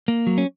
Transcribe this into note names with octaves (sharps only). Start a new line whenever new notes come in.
A#3
F#3
C#4